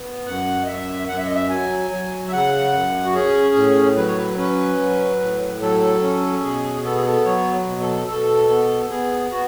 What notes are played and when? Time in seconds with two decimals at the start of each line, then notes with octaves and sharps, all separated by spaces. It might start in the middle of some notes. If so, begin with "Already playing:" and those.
Already playing: B3
0.26 F#2 F#5
0.63 D#5
0.67 F#2 E5
1.08 F#2 F#5
1.18 E5
1.27 D#5
1.35 E5
1.50 F#3 G#5
1.91 F#3
2.27 E5
2.32 C#3 F#5
2.73 F#2
3.04 F#4
3.14 C#4 G#4
3.55 A2
3.97 F#3 B4
4.07 C#5
4.17 B4
4.37 C#4 B4
4.78 F#3
5.20 A2
5.61 F#3 A4
6.02 C#4
6.43 B2 G#4
6.84 B3 A4
6.95 G#4
7.06 A4
7.25 F#3 C#5
7.67 B2
7.81 A4
8.07 B2 A4
8.49 B3
8.90 B3 G#4
9.31 B3 F#4